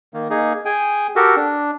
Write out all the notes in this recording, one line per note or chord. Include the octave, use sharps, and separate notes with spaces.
D#3 A#3
A#3 D#4 G#4
G#4 G5 G#5
F#4 G4 A4 A#4
D4